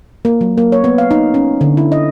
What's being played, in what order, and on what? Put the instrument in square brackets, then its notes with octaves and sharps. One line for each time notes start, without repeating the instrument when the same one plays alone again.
[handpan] A#3
F#3
A#3
C#5
B3
F5
D#4
C#4
D3
E4
D#5